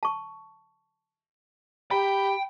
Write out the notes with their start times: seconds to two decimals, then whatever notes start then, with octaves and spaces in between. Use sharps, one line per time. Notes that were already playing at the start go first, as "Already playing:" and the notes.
0.03 A5 C#6
1.91 G4 G5 A#5 B5